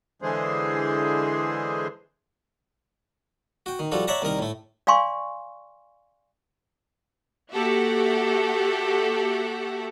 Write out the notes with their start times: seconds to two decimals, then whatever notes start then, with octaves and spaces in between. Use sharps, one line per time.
0.22 D3 E3 G#3 G#4 C5
3.66 F#4 G5
3.79 D#3
3.92 F3 G3 F#4 A4
4.08 C#5 D5 E5 F#5 A5 A#5
4.22 C2 D#3 A#4 A#5
4.39 A2 A3
4.87 D5 F5 G#5 C6 C#6
7.52 A#3 F#4 G4 A4 E5 F#5